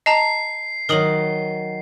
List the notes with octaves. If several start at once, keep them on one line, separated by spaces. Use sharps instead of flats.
D#5 A5 A#5 C7
D#3 F#3 A#4 D#6 F#7